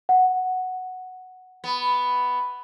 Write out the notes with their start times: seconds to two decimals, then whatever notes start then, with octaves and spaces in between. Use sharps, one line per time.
0.09 F#5
1.64 B3